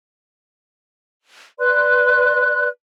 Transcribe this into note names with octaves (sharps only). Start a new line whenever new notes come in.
B4 D5 C6 F#6